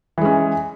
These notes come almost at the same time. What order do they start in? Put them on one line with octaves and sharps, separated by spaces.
E3 G#3 C#4